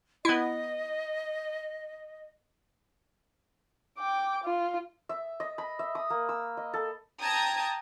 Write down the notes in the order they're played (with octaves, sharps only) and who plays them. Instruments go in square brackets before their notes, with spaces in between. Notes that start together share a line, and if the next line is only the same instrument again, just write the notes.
[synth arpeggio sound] B3 E4 [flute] D#5
[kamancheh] G5 D6
F4
[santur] E5
D#5
B5
E5
D#6
A#3
E6
D#5
A4
[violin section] G5 A5 A#5 D#6 G#6